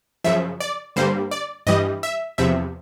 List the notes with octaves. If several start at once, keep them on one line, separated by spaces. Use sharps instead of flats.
F#2 C#3 F3 E5
D5
G2 D3 G3 A#3 C5
D5
G2 E3 G3 D#5
E5
E2 C3 F3 E5